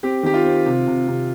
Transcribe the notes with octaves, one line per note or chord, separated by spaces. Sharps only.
C4 G4
D#3 G4
F4
C4
C3
C3
C3